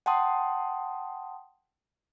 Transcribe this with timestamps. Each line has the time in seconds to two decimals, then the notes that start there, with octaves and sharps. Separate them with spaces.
0.06 F#5 G5 A5 C6 D#6